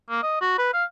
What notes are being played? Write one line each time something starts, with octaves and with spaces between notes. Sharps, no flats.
A#3
D#5
F#4
B4
F5